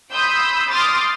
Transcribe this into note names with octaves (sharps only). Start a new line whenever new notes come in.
B5 C6 D#6 E6 G6
C6 D6 D#6 F6 A6